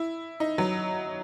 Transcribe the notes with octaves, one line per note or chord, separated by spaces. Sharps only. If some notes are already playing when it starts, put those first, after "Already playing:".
Already playing: E4
D#4
F#3